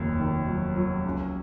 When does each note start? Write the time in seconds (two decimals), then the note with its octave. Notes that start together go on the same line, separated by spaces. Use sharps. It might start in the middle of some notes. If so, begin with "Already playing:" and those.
Already playing: F1 D#2 F#3
0.20 D#3
0.48 F#3
0.76 F#3
1.05 C#2